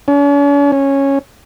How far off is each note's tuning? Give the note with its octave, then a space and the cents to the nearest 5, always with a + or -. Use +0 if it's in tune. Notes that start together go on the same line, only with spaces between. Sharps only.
C#4 +45
C#4 -10